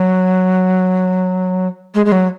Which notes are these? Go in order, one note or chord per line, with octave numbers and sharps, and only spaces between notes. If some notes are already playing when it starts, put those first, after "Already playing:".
Already playing: F#3
G#3
G#3
F#3